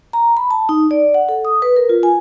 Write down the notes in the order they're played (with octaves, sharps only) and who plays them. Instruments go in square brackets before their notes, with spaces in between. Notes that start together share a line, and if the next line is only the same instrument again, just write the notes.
[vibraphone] A#5
B5
A5
D#4
D5
F#5
A4
D#6
B4
A#4
F4
G#5